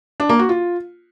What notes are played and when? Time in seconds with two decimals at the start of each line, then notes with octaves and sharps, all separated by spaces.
0.20 D4
0.29 A#3
0.39 F#4
0.49 F4